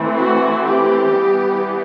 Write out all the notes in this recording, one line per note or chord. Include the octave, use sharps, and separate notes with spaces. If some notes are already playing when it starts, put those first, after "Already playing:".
Already playing: E3 A3 C4
F#4
G4
E3 G3 B3